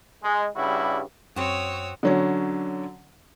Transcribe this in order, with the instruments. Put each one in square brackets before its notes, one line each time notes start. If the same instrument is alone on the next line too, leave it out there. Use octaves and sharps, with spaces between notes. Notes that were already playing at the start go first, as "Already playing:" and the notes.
[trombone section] G#3
G2 C#3 G3 E4 F#4
[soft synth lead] F#2 [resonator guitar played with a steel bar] C4 F#4 [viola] C#5 [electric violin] D#6 E6
[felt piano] D3 F#3 C#4